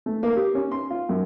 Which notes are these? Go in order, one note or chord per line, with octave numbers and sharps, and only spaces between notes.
A3
A#3
G4
C#4
C6
F4
F#2